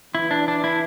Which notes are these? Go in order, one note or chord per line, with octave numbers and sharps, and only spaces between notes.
E3 E4
D4
D4
E4